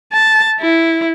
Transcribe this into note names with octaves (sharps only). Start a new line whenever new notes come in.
A5
E4